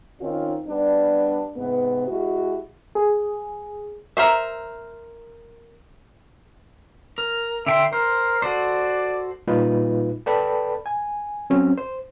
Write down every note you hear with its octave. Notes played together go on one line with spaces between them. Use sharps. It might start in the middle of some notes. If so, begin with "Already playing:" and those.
D#3 C4 C#4 D#4 F4
G3 B3 D4
G#2 C3 B3
G#3 E4 F#4 G4
G#4
A#4 C5 E5
A#4
D3 E5 G5 C6
A#4 C5
F#4 A4 C5 D5
A#2 G3 D#4 F4 B4
A4 B4 D5 G5 A5 B5
G#5
F#3 C4 C#4
C5